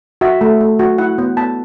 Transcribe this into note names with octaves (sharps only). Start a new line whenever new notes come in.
F#4 E5
A3
A3
F#4
E4 F#5
B3
B3 A5